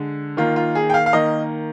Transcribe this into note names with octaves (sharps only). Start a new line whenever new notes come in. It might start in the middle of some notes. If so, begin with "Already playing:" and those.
Already playing: D3 G#3
D#3 A#3 F4
F4
G#4
G5
F5
F5
D#3 A#3 D#5